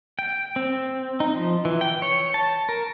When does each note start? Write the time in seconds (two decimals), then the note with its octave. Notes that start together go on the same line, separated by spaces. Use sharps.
0.19 G5
0.56 C4
1.20 D#4
1.35 F3
1.65 E3
1.81 G5
2.02 C#5
2.34 A5
2.69 A#4